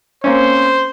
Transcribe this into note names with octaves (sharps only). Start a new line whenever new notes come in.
A#3 C4 C#4 C5